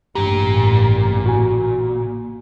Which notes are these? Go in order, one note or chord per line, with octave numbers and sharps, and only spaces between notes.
A1 G2 A#2 C#3 G4
F#4 G#5